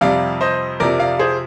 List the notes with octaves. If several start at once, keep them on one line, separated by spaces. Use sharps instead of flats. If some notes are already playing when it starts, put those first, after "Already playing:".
F2 C3 G3 D5 F5
C5 D#5
F2 C3 F3 A#4 D5
D5 F5
G#4 C5